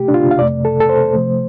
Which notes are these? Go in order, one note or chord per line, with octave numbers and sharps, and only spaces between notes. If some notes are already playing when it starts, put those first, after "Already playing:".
Already playing: C3 A3 G4
D4
F4
F5
F2 C3 A3 D5
A4
A4
C5
C3 F3 A3